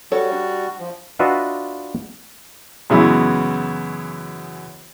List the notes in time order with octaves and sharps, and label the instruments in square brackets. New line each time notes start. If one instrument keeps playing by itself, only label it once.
[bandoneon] G3 F#4 [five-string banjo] A4 C#5
[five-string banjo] D4
[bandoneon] F3
[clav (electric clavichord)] D4 F4 F#4 B4 D#5 E5
[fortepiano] F#2 C#3 E3 G#3 B3 E4